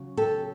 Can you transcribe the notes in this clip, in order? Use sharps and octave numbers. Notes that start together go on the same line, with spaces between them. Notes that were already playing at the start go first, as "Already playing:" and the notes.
Already playing: C#3 F#3
G4 A4